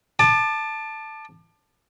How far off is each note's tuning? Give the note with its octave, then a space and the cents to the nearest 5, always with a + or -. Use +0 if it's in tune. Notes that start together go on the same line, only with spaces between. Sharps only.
A5 +0 D6 +30